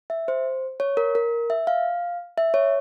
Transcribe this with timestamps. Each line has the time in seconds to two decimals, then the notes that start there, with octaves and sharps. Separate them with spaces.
0.10 E5
0.28 C5
0.80 C#5
0.97 A#4
1.15 A#4
1.50 E5
1.67 F5
2.38 E5
2.54 C#5